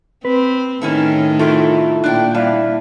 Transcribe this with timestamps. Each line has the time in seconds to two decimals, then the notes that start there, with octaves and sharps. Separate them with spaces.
0.25 C4 B4
0.81 A2 D#3 C#4 E4 A4
1.39 A3 E4 F4 A4 A#4
2.04 A#2 D4 D5 G5
2.34 G3 E4 D5 F5 A5